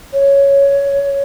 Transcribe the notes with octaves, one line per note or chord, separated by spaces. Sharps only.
C#5